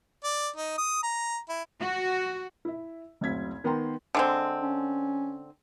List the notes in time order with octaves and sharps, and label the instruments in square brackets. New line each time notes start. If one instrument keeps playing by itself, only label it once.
[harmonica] D5
D#4
D#6
A#5
E4
[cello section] F#4
[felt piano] E4 E5
F#1 D2 C4 G#6 B6
D#3 B3 A#4 G5 A#5 C6
[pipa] D3 G#3 C4
[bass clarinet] C#4